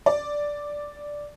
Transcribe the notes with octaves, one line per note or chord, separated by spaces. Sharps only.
D5